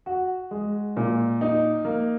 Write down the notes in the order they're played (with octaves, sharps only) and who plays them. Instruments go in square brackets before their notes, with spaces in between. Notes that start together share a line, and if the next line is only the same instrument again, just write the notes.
[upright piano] F#4
G#3
A#2
D#4
A#3